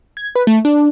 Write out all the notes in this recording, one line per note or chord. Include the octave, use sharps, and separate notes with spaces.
G#6
B4
A3
D4